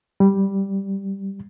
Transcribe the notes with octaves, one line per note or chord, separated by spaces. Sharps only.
G3